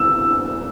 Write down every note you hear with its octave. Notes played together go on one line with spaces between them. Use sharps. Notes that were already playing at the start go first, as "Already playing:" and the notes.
Already playing: E6